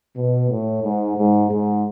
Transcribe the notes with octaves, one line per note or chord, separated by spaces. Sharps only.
B2
A2
G#2
G#2
G#2